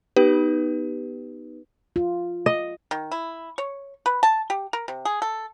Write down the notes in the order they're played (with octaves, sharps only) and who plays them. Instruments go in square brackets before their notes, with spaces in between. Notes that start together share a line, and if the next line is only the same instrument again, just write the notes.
[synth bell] B3 D#4 G4 B4
[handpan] F4
[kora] D#5
[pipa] D#3
E4
C#5
B4
A5
G4
A#4
C3
G#4
A4